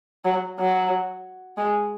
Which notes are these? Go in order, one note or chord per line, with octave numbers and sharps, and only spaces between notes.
F#3
F#3
G#3